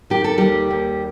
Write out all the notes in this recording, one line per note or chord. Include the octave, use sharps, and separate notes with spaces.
D#3 G4
A4
D#2 G3 G4
D#2